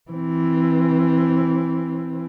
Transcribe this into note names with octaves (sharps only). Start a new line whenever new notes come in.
E3 C4